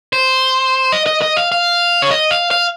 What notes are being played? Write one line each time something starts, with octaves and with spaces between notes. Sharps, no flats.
C5
D#5
D#5
D#5
F5
F5
C#5
D#5
F5
F5